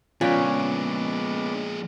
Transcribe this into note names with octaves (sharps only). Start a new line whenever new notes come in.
A#2 F3 G#3 B3 C#4 D4 B4 G5